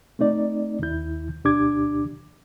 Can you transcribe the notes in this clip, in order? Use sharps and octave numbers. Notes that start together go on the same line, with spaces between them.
A3 C4 D#4 D5
D#2 E4 G6
D2 B2 D4 G4 D6 G#6